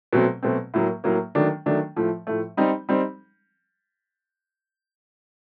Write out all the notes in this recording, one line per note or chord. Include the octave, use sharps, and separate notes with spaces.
B2 F#3 A3 C4
B2 F#3 A3 C4
A2 F#3 A#3
A2 F#3 A#3
D#3 F#3 A3 D4
D#3 F#3 A3 D4
A2 F3 A3
A2 F3 A3
G3 C4 D#4
G3 C4 D#4